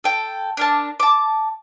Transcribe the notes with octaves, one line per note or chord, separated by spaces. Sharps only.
A4 G5
D4 A#4 A5
A5 D6